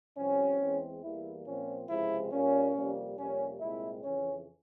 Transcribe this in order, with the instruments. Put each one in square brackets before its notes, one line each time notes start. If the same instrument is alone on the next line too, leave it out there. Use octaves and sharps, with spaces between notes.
[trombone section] C2 C3 F3 C4 C#4
E2 E3 G#3 C4
E2 E3 G3 A#3 E4
A#2 F3 C4 C#4
C#2 C3 F3 G#3 C4 E4
A#2 G3 A#3 C#4
F2 C3 G3 A#3
F2 C3 G3 A#3 C#4
C2 A#2 G#3 C4 E4
F2 C#3 E3 C#4